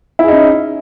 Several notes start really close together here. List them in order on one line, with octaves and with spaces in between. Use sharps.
E4 G#4 D#4 C#4